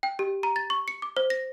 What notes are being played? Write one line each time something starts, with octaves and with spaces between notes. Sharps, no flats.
G5
G4
A#5
A6
C#6
C#7
D6
C5
A#6